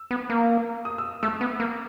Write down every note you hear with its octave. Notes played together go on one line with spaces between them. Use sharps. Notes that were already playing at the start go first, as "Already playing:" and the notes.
Already playing: E6
B3
A#3
D#6
E6
A3 E6
B3
A#3